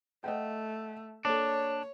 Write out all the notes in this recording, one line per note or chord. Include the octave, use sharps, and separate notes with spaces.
A3 D#5 F#5 G5
A#3 D4 A4 C#5